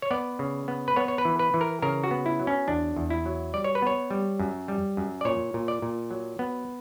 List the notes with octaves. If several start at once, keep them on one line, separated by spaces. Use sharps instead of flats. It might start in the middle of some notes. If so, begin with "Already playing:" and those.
C#5
B3 D5
C#3
B3
B4
B3 C#5
C#5
B4
E3
B4
E3
A#4
C#3 A#4
F#4
B3
E4
F#3
C#4
E2 D4
E2
E4
F#3
G3 D5
C#5
B4
B3 C#5
G3
F#2
G3
F#2
D5
A#2 C#5
A#2
D5
A#2
F#3
B3